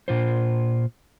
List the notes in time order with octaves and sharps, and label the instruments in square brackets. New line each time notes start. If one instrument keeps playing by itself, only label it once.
[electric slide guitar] A#2 F4 C5